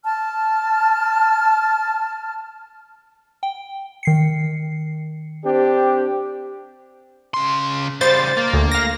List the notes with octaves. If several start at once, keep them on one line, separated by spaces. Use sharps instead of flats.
A5 F6
G5
D#3 C7 C#7
C4 D4 G4
C#3 C6
C#3 G3 C5 A6
A#3
D2
F5 A#6